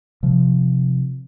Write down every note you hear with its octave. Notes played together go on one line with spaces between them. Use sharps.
C3 F3